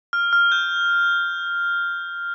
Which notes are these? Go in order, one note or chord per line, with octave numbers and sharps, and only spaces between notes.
F6
F6
G6